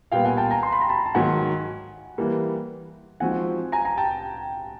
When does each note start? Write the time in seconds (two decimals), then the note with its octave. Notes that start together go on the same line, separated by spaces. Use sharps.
0.12 A#2 G3 B3 F5 G5
0.25 F#5 G#5
0.37 G5 A5
0.51 G#5 A#5
0.63 C6
0.73 B5
0.81 A#5
0.89 A5 B5
1.06 A5
1.15 G#2 D#3 F#3 F#5 G#5
2.18 E3 G3 A#3
3.20 F3 G#3 C4 D#4 F#4 F#5 G#5
3.72 G#5 A#5
3.85 G#5 A#5
3.98 G5 A5